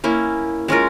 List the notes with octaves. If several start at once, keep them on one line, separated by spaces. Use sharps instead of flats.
A#3 C#4 E4
G#3 C#4 F4 A#4